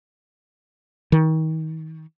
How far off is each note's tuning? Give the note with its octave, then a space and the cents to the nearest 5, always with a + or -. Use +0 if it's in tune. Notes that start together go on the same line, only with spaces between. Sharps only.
D#3 +35